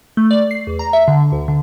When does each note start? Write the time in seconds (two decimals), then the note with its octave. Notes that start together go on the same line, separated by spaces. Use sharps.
0.17 A3
0.31 D5
0.51 C7
0.67 E2
0.79 A#5
0.93 E5
1.08 D3
1.32 D2
1.48 D3